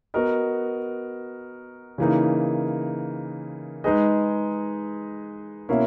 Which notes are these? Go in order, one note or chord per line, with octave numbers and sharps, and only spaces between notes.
B3 F#4 A#4 D#5
C#3 E3 A#3 D#4
G#3 D#4 G#4 B4 D#5
B2 A#3 C#4 E4